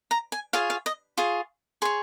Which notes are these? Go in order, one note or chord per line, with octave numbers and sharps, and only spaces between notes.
A#5
G#5
F4 G#4 C#5 F5
F5
D#5
F4 G#4 C#5
G#4 C#5 C6